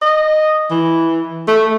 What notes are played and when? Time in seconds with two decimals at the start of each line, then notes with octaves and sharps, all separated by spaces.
0.02 D#5
0.71 E3
1.48 A3